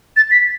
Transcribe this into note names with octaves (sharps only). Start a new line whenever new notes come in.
A6
B6